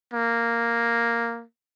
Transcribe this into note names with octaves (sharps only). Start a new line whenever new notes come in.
A#3